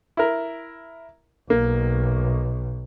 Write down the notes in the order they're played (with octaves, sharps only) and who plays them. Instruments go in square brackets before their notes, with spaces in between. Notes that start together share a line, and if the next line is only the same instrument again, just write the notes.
[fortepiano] E4 A#4
[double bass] B1 [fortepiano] A#3